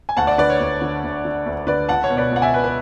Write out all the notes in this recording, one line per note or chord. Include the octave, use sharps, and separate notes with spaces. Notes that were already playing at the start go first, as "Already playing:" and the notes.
G#5
D2 F#5 A5
D5 F#5
D3 B4 D5
C#5
D2
D3
D2
D3
D2
D3 B4 D5
C#2 F#5 A5
C#5
B2
B4 D5
C#2 F#5
E5 G#5
B2 B4
B4